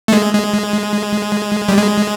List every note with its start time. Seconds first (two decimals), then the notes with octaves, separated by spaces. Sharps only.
0.08 A3
0.12 G#3
0.34 G#3
1.68 G3
1.78 G#3